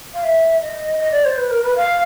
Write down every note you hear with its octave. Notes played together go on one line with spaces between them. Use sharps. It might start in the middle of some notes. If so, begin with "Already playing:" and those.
F5
E5
D#5
D#5
D5
C5
B4
A#4
B4
F5